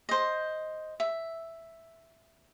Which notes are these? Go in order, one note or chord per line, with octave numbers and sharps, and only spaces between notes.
C5 D#5
E5